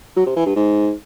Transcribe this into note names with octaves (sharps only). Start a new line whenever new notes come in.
F#3
C3
E3
G2
G#2